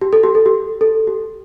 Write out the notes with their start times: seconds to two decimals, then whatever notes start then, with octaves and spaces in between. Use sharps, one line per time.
0.01 G4
0.13 A4
0.23 G4
0.35 A4
0.46 G4
0.81 A4
1.07 G4